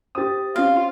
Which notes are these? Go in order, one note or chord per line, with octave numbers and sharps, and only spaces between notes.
G4 C5 D#6 A6
C4 C#4 F4 F5